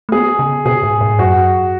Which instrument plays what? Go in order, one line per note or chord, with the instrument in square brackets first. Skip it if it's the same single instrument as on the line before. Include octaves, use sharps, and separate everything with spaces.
[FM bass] A3
[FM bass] B3 [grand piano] G#4
[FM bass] C#3
[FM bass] B2 [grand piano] G#4
[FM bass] G#2
G#2
[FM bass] F#2 [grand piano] F#4